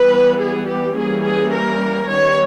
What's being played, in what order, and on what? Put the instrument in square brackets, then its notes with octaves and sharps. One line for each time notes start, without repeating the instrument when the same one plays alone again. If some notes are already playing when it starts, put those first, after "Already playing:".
Already playing: [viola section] E3 G3 B3 B4
G#4
G4
E3 G3 A#3 C#4 G#4
G#4
A#4
D#3 G3 B3 C#5